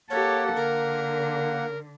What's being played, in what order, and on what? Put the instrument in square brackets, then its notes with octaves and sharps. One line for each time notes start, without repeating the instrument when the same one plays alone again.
[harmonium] A#3 F#5 [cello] G4 A4 [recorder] C#5
[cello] D3 [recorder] A#4